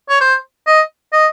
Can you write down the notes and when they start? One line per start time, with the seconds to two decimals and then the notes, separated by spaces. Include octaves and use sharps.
0.09 C#5
0.21 C5
0.67 D#5
1.13 D#5